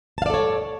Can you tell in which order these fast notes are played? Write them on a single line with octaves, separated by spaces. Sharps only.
A5 F5 D5 A4 C#5